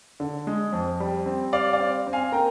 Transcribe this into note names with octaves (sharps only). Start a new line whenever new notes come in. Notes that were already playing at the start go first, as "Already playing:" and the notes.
D3
G#3
F2
G3
C4
G3 D5 F5
D5 F5
C4
C4
F5 G#5
A#3 G5 A#5